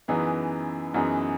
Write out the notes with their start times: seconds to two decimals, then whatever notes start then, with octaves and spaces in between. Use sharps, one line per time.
0.08 F#2 E3 B3 D#4 G#4
0.94 F#2 E3 B3 D#4 G#4